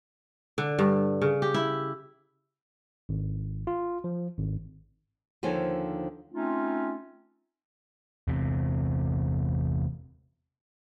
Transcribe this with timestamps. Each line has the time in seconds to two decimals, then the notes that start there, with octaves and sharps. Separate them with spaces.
0.58 D3
0.79 G2
1.22 C#3
1.42 G4
1.54 E4
3.09 G#1
3.67 F4
4.04 F3
4.39 G#1
5.43 D#2 D3 F3 C5 C#5 G#5
6.32 A3 C4 C#4 D#4 F4
8.28 E2 C3